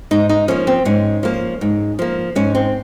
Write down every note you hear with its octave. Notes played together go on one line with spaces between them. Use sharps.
G#2 D#4
D#4
F3 A#3 C#4
C4
G#2 C#4
F3 A#3
G#2
F3 A#3
G#2 C#4
C4